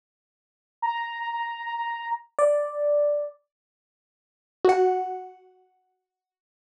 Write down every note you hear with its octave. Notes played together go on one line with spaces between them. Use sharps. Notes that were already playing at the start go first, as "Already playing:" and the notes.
A#5
D5
F#4 F#5